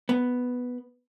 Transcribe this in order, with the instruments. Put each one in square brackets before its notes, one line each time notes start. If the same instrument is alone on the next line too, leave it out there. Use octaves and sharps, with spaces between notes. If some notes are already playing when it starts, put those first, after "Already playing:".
[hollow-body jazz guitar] B3